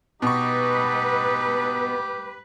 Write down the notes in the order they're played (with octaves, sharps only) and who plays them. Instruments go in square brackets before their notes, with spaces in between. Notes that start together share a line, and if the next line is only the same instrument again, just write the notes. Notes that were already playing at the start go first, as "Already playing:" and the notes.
[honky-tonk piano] B2 C#6 [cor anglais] D#4 [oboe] G4 [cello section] B4